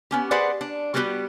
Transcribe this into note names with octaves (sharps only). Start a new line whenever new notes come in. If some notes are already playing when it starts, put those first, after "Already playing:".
B3 C#4 G4
G4 G#4 B4 C5 D5 F#5
D4
G3 B3 F#4 G4 A#4 B4